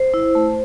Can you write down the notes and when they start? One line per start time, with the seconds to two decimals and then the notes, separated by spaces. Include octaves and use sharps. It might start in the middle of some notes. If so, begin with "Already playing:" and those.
Already playing: C5
0.14 E4
0.35 A3